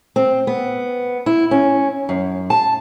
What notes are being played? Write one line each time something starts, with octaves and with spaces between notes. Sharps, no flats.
C4
B3
E4
C#4
F#2
A5